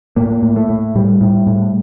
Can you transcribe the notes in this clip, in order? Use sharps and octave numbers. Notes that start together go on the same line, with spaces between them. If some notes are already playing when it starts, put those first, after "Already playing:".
A2 A#3
A2
A3
A2
A2 G3
A2
A2